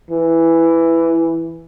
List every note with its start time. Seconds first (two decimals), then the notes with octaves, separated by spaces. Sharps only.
0.11 E3